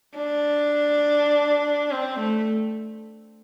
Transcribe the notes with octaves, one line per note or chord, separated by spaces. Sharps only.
D4
C4
A3